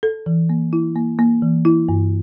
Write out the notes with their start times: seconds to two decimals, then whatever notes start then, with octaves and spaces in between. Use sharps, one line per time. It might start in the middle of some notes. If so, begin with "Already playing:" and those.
0.03 A4
0.26 E3
0.50 A#3
0.73 E4
0.96 A#3
1.19 A#3
1.42 E3
1.65 E4
1.89 G2